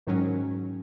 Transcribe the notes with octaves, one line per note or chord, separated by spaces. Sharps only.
G#2 D#3 F#3 C#4